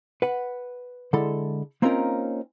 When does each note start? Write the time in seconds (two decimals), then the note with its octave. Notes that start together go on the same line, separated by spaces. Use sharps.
0.22 B4 F#5
1.13 D3 G#3 E4 A4
1.82 A#3 C4 C#4 D#4 F4 A#4